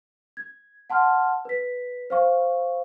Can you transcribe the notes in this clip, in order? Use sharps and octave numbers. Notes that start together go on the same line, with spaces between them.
G#6
F#5 A5 C6 F6
B4 B6
C5 F5 C#6